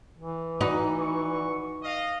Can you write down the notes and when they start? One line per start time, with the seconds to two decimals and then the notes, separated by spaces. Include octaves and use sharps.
0.18 E3
0.61 D#4 F#4 B4 D5
0.99 C#6
1.82 D#5 F5